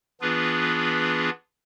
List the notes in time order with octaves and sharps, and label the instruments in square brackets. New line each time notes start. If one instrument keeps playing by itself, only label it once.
[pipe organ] E3 B3 D4 F4 G#4 B4